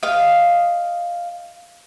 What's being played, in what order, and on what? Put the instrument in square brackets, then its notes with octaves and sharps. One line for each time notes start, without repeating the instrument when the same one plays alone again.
[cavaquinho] D#5 F5